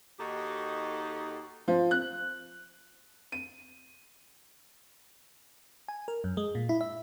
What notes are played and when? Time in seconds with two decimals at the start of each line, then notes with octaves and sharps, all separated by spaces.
0.19 D#2 D#4 F#4 G4 A4 D#5
1.68 F3
1.91 F#6
3.32 D#7
5.88 G#5
6.08 A#4
6.24 F#2
6.37 G#3
6.55 A#2
6.69 E4
6.81 E5